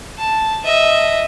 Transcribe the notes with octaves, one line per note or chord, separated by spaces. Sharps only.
A5
D#5 E5